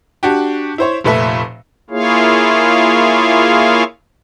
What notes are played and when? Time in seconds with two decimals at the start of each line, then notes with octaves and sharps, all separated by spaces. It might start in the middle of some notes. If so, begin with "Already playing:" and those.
0.23 D4 F#4 G4
0.78 E4 C5 C#5
1.04 F1 A#2 A3 B4 E5
1.90 A#3 E4 F4 G#4 C#5 F5